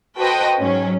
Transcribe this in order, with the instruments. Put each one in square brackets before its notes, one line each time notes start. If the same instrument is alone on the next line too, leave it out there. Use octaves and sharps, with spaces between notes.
[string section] F#4 A4 B4 C5 D#5 G5
G#2 F#3 C#4